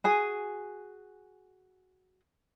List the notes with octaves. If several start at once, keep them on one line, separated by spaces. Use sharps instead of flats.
F#4 G#4 G#5